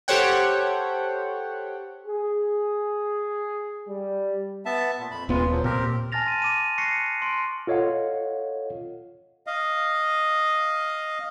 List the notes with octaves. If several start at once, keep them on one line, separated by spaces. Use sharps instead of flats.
G4 A4 C5 C#5 F#5 G5
G#4
G3
B3 E5 A5
A#2
F2 B5
D#1 A#2 G#3 B3 F4
F3 F#3
A#2 C4 G4 A#4
G#5 A5 F6 A6 A#6 F7
C6 D#7
D6 D#7
C#6 F#6 A#6 C7 C#7
C6 D7
F4 A4 C#5 D#5 F5 F#5
D#5 F5